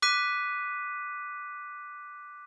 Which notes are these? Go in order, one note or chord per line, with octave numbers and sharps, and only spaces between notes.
D6 F#6 B6 D#7